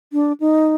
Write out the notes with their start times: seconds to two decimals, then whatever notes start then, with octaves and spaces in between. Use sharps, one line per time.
0.13 D4
0.40 D#4